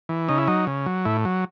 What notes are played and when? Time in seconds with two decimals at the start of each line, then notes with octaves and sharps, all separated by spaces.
0.09 E3
0.29 C#3 D#4
0.38 E4
0.48 F#3 D#4
0.67 C#3
0.86 F#3
1.05 A2 E4
1.25 F#3